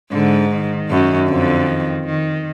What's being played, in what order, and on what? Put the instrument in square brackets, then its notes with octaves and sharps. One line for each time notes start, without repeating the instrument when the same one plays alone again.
[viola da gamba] G#2 [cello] D3
[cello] D#3
[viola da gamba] F#2
[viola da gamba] F2 [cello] D3
[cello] D#3
D#3